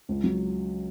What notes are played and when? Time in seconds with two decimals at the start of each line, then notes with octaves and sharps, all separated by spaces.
0.09 C#2
0.24 F#3